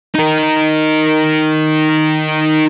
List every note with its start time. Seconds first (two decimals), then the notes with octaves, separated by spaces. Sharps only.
0.15 D#4 A#4